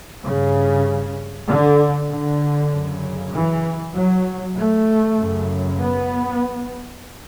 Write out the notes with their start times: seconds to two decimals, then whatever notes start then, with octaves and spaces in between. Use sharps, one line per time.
0.23 G2 C#3
1.47 D3
2.09 D3
2.71 F#2 C#3
3.32 E3
3.94 F#3
4.56 A3
5.18 F#2 C#3
5.80 B3